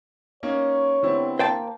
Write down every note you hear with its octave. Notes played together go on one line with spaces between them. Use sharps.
A#3 C#4 D#4 C#5
D3 B3 C4 E4 G4
A#3 C5 G5 A5